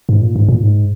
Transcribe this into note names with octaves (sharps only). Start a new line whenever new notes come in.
G#2
A#2
G#2
A#2
G#2